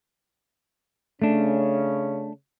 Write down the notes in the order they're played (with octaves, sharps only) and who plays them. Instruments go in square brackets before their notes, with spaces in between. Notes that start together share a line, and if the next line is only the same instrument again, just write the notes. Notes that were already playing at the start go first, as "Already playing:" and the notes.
[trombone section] C#3 C#4 [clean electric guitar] A3 D4